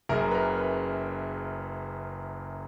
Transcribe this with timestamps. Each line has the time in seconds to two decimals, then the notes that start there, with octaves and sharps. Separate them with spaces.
0.09 F#1 F#2 C#3 A#4
0.31 B4
0.35 A#4
0.60 B4